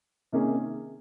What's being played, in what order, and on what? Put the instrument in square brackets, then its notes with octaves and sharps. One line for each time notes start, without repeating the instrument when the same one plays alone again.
[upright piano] C3 D#3 A#3 C#4 G#4